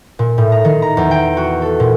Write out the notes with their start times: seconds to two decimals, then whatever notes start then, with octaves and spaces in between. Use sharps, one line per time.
0.19 A#2
0.38 A2
0.52 A#5
0.65 D#3
0.82 A#5
0.97 E2
1.11 G5
1.37 F#4
1.62 A4
1.80 A#2